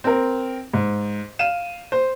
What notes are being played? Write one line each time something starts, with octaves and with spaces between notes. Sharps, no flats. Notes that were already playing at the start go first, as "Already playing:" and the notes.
C4 A#4
G#2
F5 D#7 E7
C5